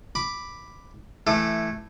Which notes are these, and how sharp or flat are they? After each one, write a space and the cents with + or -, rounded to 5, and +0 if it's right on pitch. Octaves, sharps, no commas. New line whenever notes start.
B5 +0 D6 +0
E3 +5 A3 -5 D6 +40